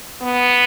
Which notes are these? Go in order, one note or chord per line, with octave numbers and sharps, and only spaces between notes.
B3